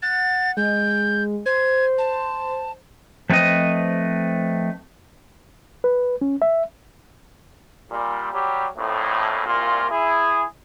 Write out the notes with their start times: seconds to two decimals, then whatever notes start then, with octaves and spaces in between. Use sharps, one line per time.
0.02 F#5 A6
0.57 G#3 G6
1.46 C5 G#6
1.98 A5
3.30 F3 A3 C4 B4 D#5
5.84 B4
6.22 C#4
6.42 E5
7.91 A#2 G3
8.32 F#3 G3 G4
8.77 A#1 F2 A2
9.46 C2 A#2 A#3 F4
9.90 E4 G#4